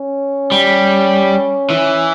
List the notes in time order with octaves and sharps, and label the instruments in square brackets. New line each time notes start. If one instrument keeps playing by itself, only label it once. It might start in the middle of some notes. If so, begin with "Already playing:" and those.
Already playing: [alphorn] C#4
[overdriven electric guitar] G3
E3